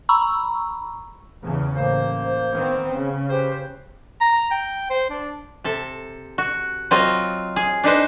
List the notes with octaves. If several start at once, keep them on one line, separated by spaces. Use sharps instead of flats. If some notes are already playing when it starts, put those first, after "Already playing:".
A#5 B5 C#6 E6
E2 C#3
A1 A#3 C5
D#3 B3 C4
C#3
G4 B4 C5
A#5
G5
C5
D4
C3 A4
F#4
F#3 C4 F4 D#5
G#4
D4 D#4 B4 C5